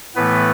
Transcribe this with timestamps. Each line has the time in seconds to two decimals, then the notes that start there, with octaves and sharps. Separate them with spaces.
0.16 A2 E3 A3 B3 B4